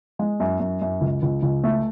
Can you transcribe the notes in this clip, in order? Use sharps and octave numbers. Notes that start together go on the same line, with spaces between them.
G#3
F#2
F#2
F#2
C#2
C#2
C#2
A3